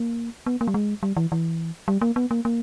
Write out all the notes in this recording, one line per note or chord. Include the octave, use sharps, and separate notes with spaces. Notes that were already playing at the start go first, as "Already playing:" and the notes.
Already playing: A#3
B3
A#3
G3
G#3
G3
E3
E3
G3
A#3
B3
A#3
A#3